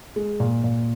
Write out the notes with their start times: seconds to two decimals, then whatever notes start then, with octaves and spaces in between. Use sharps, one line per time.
0.16 G#3
0.40 A#2
0.64 A#2